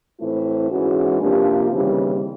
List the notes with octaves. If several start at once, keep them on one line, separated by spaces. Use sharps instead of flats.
A2 E3 A3 C4 E4
G#2 E3 G#3 C#4 F#4
C3 F3 A#3 D4 G4
D#2 C#3 E3 G3 C4